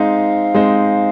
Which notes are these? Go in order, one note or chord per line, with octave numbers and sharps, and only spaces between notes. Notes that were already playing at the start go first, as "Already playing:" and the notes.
Already playing: G#3 C4 D#4 C5 F5
G#3 C4 D#4 C5